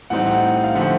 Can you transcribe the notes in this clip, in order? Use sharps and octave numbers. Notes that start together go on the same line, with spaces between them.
A2 E3 G3 C4 D#4 F#5
F#5
F5
D3 F3 A3 C4 F#5